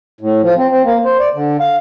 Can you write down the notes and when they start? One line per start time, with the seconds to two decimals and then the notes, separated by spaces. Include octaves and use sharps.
0.21 A2
0.42 F3
0.57 C4
0.71 C4
0.84 A#3
1.05 C5
1.20 D5
1.34 D3
1.60 F5